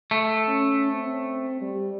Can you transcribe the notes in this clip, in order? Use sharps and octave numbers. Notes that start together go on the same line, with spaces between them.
A3
C#4
C4
G3